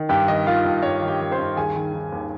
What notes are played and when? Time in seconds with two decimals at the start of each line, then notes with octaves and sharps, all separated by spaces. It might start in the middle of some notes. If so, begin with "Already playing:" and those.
Already playing: D#3
0.09 G2 G4 G5
0.28 D#3 D#5
0.46 D#3 F4 F5
0.65 G2
0.83 G2 C#5
1.02 D#3
1.08 G4 G5
1.20 D#3
1.32 C5 C6
1.38 G2
1.56 D#2 G#4 G#5
1.76 D#3
1.93 D#3
2.12 D#2